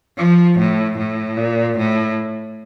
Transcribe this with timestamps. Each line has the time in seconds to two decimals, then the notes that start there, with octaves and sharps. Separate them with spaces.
0.18 F3
0.59 A2
0.98 A2
1.37 A#2
1.77 A2